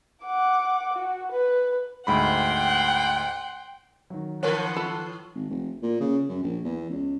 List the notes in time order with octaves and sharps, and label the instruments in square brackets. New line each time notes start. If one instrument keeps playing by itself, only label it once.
[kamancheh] F#5 D6
F#4
B4
[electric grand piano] D2 G#2 B5 [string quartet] F#5 C6 [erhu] G5
[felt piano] D#3 F#3
[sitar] A2 E3 B4 [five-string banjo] A#4 C#5 [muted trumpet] F#5
[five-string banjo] F4 A4 B5
[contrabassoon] G#1
F1
A#2
C#3
F#2
A#1
E2
C#2